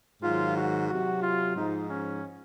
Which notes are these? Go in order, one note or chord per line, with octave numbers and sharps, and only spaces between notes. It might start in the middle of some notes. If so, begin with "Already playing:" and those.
G#2 D#3 F#3 F4
F#4
C3 F#3 F#4
F4
G#2 F3 D#4
C#4